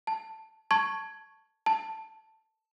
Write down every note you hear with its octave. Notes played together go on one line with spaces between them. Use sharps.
A5
A5 C#6 G#6
A5